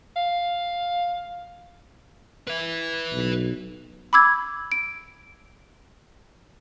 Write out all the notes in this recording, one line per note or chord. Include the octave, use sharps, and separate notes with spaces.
F5
B4 E5
B1
B5 D6 E6 G#6
D7